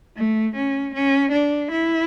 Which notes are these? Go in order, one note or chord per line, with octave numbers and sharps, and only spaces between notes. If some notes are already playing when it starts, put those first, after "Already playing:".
A3
C#4
C#4
D4
E4